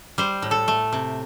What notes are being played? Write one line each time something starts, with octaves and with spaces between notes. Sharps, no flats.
G3 C5
A2
A4
A3
C3